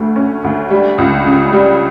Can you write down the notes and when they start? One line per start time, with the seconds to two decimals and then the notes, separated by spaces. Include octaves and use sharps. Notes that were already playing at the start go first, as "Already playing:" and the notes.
Already playing: D2 A3
0.16 C#4
0.44 D2
0.70 G3
0.98 C#2
1.25 C#3
1.53 G3